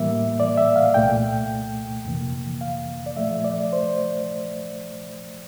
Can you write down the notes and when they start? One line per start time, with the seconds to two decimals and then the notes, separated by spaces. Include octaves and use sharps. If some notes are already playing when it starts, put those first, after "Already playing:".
Already playing: A2 E3 G3 A#3 E5
0.40 D5
0.58 E5
0.76 F5
0.94 C2 A#2 A3 G5
2.05 F2 C3 E3 A#3
2.61 F5
3.06 D5
3.17 A#2 F3 A3 E5
3.44 D5
3.73 C5